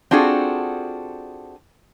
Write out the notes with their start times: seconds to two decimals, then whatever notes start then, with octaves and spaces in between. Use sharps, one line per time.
0.11 C4 D4 F4 F#4 G#4 A4